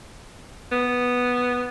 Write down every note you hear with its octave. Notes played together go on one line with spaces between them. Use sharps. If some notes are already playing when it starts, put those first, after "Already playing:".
B3